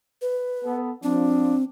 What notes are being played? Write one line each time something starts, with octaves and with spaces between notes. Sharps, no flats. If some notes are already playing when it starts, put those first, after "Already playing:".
B4
B3 A4
F3 C4 D4